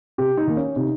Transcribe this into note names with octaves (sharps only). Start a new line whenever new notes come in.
C3 G4
D#4
D#3 A#3
C#4
C3 D#4